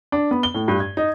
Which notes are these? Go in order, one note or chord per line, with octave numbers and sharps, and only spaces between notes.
D4
B3
G7
A2
G2
G#6
D#4